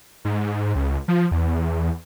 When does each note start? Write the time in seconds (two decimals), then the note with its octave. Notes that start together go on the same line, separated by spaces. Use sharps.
0.25 G#2
0.75 C#2
1.08 F3
1.31 E2